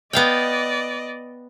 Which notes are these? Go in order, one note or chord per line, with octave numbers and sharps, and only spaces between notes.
B3 D5 D#5 F5 G5